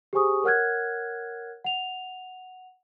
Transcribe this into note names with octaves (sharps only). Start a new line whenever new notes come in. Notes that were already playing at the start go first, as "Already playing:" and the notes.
G4 G#4 C5 G#5 C#6 D#6
A#4 C#5 F#5 F6 F#6 G#6
F#5 F7